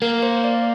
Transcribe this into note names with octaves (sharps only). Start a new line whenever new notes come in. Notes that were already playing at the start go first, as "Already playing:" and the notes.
A#3 A#4
C5
D5